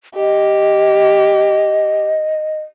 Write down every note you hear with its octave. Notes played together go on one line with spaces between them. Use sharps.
G4 D#5